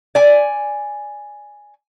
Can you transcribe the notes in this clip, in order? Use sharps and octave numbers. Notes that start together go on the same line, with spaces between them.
D5 G#5